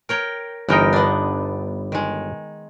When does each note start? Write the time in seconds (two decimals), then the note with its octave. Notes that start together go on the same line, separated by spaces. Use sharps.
0.09 A#4 C#5 G5
0.69 G1 E3 D#4 A#4 G5
0.93 B3 D4
1.92 D#3 G#3